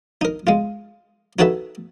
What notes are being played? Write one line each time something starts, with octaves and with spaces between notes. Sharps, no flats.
D#4 A#4
G#3 F4
D#4 F#4 G#4 A4 B4 E5